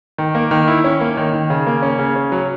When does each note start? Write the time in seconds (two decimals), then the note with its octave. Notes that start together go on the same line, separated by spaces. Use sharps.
0.18 D#3
0.35 A#3
0.51 D#3
0.68 E4
0.84 C#4
1.01 A#3
1.17 D#3
1.33 D#3
1.50 C#3
1.67 A#3
1.82 C#4
1.99 C#3
2.16 C#4
2.32 F#3